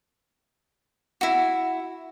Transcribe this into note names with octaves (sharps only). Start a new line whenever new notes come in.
E4 F#4